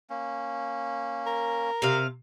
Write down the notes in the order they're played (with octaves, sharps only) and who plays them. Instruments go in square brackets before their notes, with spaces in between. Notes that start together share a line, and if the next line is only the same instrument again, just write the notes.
[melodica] A#3 C#4
[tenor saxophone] A#4
[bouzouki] C3 F5